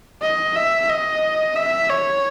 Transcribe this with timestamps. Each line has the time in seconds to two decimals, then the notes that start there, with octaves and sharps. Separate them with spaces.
0.22 D#5
0.56 E5
0.89 D#5
1.56 E5
1.90 C#5